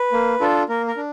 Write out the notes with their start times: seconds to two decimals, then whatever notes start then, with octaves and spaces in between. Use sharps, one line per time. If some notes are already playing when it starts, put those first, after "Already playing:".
Already playing: B4
0.13 A#3
0.40 D4 F4 A4
0.69 A#3 A#4
0.88 A#4
0.97 D4